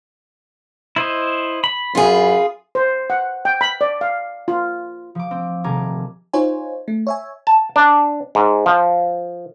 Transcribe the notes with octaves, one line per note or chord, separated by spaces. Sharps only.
E4 C5 D#5
B5
F#2 F4 G#4
C5
F#5
G5
B5
D5
F5
F4
F3 D6
C4
D#1 C3 A3 A#4 G#5 D6
D#4 F4 C5 C#5 G#5
A3
C#5 E5 G#5
A5
D4
G#2
F3